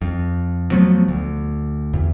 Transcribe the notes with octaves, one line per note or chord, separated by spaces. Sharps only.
F2
F3 F#3 A3 B3
D2
E2